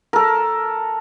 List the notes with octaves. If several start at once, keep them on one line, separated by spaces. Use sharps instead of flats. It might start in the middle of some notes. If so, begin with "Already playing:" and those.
A4 A#4